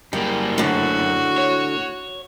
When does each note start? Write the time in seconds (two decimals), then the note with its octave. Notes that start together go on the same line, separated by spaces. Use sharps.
0.13 F#2 G3 A#3
0.58 A2 D3 F#4
1.38 C#5